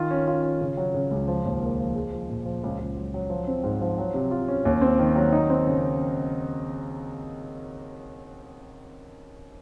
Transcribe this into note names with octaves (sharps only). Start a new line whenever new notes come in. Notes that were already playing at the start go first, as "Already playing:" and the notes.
Already playing: D#3 F4
C#4
F4
C#4
C#3
F#3
C#3
C#2
F3
D#2
A#3
F3
G#3
F3
A#2
F3
C#2
C#2
F#3
F#3
F3
C4
G#2
F3
F#3
C3
F4
C#4
D#2
C4
D#3
F#3
D#4
C4
C#3